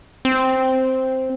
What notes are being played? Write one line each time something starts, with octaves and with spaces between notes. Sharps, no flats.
C4